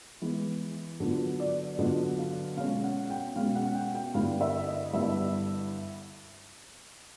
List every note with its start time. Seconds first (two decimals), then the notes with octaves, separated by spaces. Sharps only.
0.21 E3 G#3 B3
1.00 D3 F#3 B3 D4 F4
1.40 D5
1.79 D3 F#3 B3 D4 F4 D#5
2.18 F5
2.57 B2 G#3 C#4 F5
2.83 F#5
3.10 G5
3.36 B2 G#3 C#4 F5
3.55 F#5
3.75 G5
3.95 G5
4.14 G2 D3 G3 B3 E4 F5
4.41 E5
4.67 D#5
4.93 G2 D3 G3 B3 E4 E5